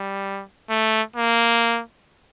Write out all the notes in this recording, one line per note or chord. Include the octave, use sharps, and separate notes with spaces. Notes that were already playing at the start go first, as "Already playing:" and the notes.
Already playing: G3
A3
A#3